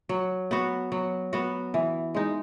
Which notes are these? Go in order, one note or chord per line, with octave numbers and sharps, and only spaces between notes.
F#3
B3 F#4
F#3
B3 F#4
E3
G#3 D#4